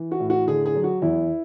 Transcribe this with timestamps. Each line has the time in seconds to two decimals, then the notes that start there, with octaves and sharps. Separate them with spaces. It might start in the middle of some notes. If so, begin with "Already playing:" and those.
Already playing: E3
0.12 F#4
0.20 A2
0.30 F#4
0.47 D3 G#4
0.66 G#4
0.75 F#3
0.84 F#4
1.02 E2 E4